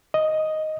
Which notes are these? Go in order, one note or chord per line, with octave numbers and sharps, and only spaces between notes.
D#5